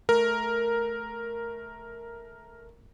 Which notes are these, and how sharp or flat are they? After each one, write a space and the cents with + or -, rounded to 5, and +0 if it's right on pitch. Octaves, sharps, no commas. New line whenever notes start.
A3 -15 A#4 +0